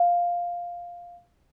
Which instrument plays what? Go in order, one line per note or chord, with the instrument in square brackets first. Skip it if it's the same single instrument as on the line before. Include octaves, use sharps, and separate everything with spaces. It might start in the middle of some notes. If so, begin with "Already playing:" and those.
Already playing: [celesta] F5